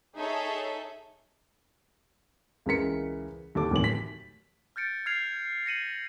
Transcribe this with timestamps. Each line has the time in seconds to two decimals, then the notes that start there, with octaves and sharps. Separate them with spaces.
0.16 D#4 G#4 A4 C#5 E5
2.66 C#2 C#3 E3 A#4 B6 C#7
3.55 D#2 A4 A5 D6
3.71 D1 A2 D#3 E3 F#7
3.84 B6
4.76 F6 G6 A6 C#7 D7
5.06 F6 G#6 C7 F7
5.66 A#6 C#7 D#7 F#7